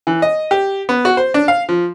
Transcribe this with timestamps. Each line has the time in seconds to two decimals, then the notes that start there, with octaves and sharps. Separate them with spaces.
0.07 E3
0.22 D#5
0.51 G4
0.89 B3
1.05 F#4
1.17 C5
1.34 D4
1.48 F5
1.69 F3